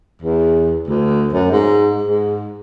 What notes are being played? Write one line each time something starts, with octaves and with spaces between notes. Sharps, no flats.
E2
D2
F#2
G#2
G#2